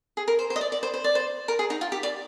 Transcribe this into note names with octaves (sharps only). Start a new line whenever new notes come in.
G#4
A#4
C5
C5
D#5
D5
D5
C5
C5
D5
C5
A#4
G#4
D#4
F4
G4
D5